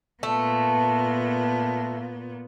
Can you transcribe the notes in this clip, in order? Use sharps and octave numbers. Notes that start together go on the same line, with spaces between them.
A#2 A3 B3